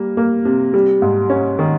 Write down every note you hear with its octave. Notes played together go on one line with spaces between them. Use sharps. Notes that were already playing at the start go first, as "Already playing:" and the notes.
Already playing: G3 A#3
A#3
C3
G3
G#2
C#4
D#3